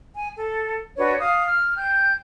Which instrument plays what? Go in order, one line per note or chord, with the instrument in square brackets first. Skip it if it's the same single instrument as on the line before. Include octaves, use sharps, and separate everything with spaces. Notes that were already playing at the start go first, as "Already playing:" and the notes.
[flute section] G#5
A4
D4 F#4 B4 C#5
F5 D#6
F6
G5 G6